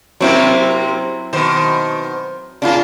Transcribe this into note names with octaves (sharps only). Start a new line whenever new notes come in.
F#2 C3 F#3 A#3 C4 E4
B2 D#3 C5
C#3 A#3 D4 E4 F4